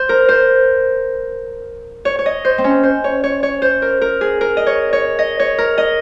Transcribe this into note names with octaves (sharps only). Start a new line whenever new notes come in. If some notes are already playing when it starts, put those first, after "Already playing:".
Already playing: C5
A#4
C5
C#5
C#5
D#5
C5
C4
C#4
C5
C#5
C#5
C#5
C5
A#4
A#4
G#4
A#4
D#5
C#5
C#5
D#5
C#5
A#4
D#5